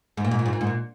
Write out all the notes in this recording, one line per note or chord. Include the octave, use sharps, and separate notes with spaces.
G#2
A#2
G#2
A#2
G#2
A#2
G#2
A#2